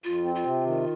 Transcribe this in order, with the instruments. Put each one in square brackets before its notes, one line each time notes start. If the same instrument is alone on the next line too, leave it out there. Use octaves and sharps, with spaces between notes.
[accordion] F2 [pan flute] F4
[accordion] C4
[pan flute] F4
[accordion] C3
D#3